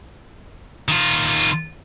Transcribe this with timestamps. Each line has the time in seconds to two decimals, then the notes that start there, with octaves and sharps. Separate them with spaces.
0.88 D#3 F4